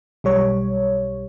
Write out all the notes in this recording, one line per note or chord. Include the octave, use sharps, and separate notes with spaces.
B1 G3 C#5